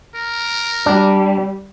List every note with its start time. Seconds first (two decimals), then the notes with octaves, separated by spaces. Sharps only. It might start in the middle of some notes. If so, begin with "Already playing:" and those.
0.15 A#4
0.86 G3 D4